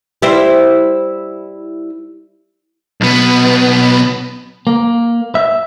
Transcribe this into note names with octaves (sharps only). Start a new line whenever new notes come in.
G3 E4 C5
B1 B3
A#3
E5